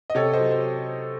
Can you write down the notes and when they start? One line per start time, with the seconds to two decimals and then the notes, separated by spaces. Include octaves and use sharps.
0.10 D#5
0.15 C3 A4 C#5
0.33 C5 D#5
0.39 F#3
0.51 C5